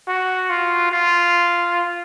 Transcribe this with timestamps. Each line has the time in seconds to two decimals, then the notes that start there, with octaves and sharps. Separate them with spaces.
0.08 F#4
0.50 F4
0.92 F4